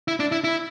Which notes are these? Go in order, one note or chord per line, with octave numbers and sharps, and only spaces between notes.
E4
D4
E4
E4